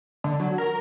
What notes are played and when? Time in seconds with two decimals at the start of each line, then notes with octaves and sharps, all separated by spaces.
0.24 D3
0.40 F#3
0.58 A#4